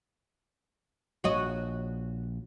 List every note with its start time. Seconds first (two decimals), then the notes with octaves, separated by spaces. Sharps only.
1.24 A#1 F#4 C#5 D#5